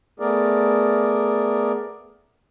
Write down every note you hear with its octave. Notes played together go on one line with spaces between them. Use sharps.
A3 B3 G#4 A#4 D5